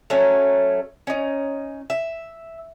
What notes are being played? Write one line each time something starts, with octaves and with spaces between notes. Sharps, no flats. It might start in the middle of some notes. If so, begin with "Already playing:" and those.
F#3 A3 C#4
C#4 D#4
E5